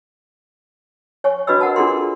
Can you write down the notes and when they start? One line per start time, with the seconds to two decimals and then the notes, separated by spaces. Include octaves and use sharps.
1.24 C#5 G#5 C#6
1.47 D4 F#4 B4 D#5 B5 E6
1.61 A#4 F#5 A5
1.76 D4 F4 G#4 A4 A#5 C6